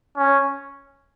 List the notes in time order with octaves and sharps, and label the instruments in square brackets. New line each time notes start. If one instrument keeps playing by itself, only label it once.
[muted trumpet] C#4